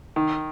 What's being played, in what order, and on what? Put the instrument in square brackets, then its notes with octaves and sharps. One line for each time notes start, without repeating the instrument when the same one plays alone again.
[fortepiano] D#3